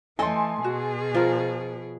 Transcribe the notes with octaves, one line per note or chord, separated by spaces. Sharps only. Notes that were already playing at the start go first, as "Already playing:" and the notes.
E3 A3 A4 D#5 G5 G#5 C6
B2 F#4 G#4
F3 F4 A#4